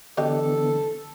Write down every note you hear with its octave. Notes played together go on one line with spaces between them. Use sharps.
D3 E3 B3 D4 G4 A4 D#5